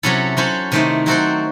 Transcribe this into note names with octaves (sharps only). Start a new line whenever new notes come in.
C3 F#3 C#4 E4 A4
F#3 C#4 E4 A4 C5
C3 D#3 A3 C4 D#4
F#3 C4 F#4 A4 C5